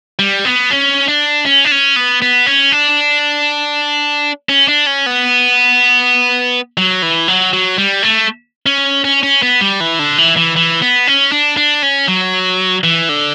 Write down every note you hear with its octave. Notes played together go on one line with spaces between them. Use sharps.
G3
B3
C#4
D4
C#4
D4
C#4
B3
B3
C#4
D4
C#4
D4
C#4
B3
F#3
E3
F#3
F#3
G3
A3
C#4
C#4
C#4
B3
G3
E3
D3
E3
E3
E3
B3
C#4
D4
D4
C#4
F#3
E3
D3